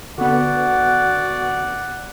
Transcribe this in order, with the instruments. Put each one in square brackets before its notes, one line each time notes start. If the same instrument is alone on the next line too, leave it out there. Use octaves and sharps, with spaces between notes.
[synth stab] D3 B3 [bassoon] F#4 [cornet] D5 [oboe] F#5